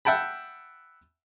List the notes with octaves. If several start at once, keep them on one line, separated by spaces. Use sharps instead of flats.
E5 F#5 G5 A5 B5